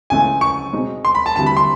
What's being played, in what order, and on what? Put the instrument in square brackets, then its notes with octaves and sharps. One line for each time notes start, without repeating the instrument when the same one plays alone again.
[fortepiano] C#2 C#3 E3 A3 [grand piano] G#5
[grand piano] C#6
[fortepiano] B2 G#3 C4 D#4
[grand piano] C6
B5
A5
[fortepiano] D2 C3 E3 G3 [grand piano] A5
[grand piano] B5
C6